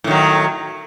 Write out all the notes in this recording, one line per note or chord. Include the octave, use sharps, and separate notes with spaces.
A2 D#3 F#3